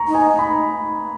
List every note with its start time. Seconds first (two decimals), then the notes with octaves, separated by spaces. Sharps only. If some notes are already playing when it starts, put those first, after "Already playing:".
Already playing: A#5 C#6
0.08 D#4
0.15 G#5
0.39 B5